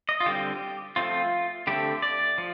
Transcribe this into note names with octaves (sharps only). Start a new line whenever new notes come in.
D#5
F4
D3 G3 C4 G4
F3 A3 C4 F4
D3 A3 C4 G4
D5
F3